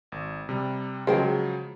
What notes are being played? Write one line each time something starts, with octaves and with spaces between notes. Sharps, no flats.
G#1
C3 G3
C#3 F3 F#3 G#3 C5 G5